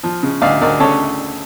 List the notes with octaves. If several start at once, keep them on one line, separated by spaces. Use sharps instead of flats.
F3
C#3
D2 D5 F5
D2 A#4 D5
C#3 A4 C#5